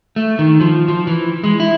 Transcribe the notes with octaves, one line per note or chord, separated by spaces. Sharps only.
A3
D#3
F3
F3
E3
G#3
E4